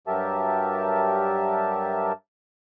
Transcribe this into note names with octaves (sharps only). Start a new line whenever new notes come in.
G2 F#3 G4 A#4 E5 A5